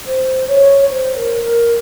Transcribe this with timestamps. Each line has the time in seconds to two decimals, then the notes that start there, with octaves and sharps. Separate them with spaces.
0.06 C5
0.48 C#5
0.88 C5
1.15 A#4
1.43 A#4